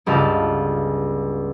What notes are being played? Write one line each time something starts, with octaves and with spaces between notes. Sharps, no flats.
G1 C#2 G4 B4 F5 A5